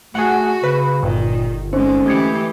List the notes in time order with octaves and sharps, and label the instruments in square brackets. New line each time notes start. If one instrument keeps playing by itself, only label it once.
[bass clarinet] A3 [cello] F#4 [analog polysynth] G#4 F#5
[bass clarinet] C#3 [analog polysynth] B4
[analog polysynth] G1 [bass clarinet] A#2 [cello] D#3
[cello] D3 G#3 [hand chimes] C4 D#4 C5 [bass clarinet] C#4
[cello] E3 G4 [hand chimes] A3 G#6 C#7